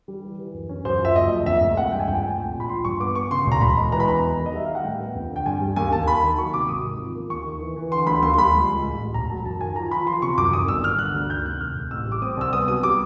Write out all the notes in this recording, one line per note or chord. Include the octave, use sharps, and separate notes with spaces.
G3
E3
E3
F#2
C#4
F#2 C5
F3 E5
F#1 D#5
F#1
F2 E5
F1
G#3 F#5
G2 G5
G#5
F2 G5
G#5
F1 G5
G#5
A#2 G5
A#1
B5
F3 C6
G2 C#6
B3 D6
B3 C#6
C#3 C6
E1
A#5
E1 B5
G#3
E3 A#5
B5
E2 A#5
F#3
D#3
D#5
G3 E5
G3 F5
F#5
A2 G5
B3
F2
D3
G5
G2 G#5
G3
D#2 G#5
D#2 A5
A#3 B5
D#3
F#3 C#6
C3 D6
G#1 D#6
D#3
F3
A#3
D#2 C#6
D#3
E3
E3
D3 C6
D2 B5
D#2 C6
C6
G3 B5
C#2
C#2
A1
A1
E1 A#5
F#3 A5
F#2 A5
D#3 G#5
F3 A#5
F3 B5
F3 C6
C3 C#6
F#2 D6
D#3 D#6
G1 E6
G1 F6
D3 F#6
D2
D#3 G6
C3 F#6
F1 F6
F1
A1 E6
G3 D6
C4 D#6
C2 E6
B3 D#6
F#3 D#6
G3 D6